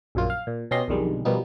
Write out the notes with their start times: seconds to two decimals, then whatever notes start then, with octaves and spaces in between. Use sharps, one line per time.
0.15 A#1 F#2 A#2 F4
0.30 F5
0.47 A#2
0.71 B2 C#4 G4 D#5 C6 A#6
0.88 B1 F2 D3 D#3 G3 G#3
1.25 B2 F3 G3 A#3 B3 D#4